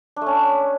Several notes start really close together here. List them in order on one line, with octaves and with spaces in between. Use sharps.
D4 A3 C#4